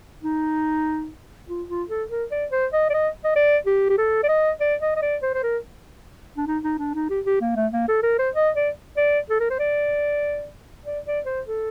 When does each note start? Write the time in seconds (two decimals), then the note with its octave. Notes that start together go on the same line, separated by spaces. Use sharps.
0.23 D#4
1.48 F4
1.69 F4
1.89 A4
2.10 A#4
2.31 D5
2.52 C5
2.73 D#5
2.90 D5
2.94 D#5
3.25 D#5
3.36 D5
3.66 G4
3.90 G4
3.98 A4
4.24 D5
4.29 D#5
4.61 D5
4.82 D#5
4.96 D#5
5.02 D5
5.22 C5
5.34 C5
5.43 A#4
6.37 D4
6.48 D#4
6.64 D#4
6.79 D4
6.95 D#4
7.10 G4
7.26 G4
7.41 A#3
7.56 A3
7.73 A#3
7.88 A4
8.03 A#4
8.19 C5
8.35 D#5
8.55 D5
8.98 D5
9.30 A4
9.40 A#4
9.50 C5
9.60 D5
10.85 D5
11.06 D5
11.26 C5
11.47 A4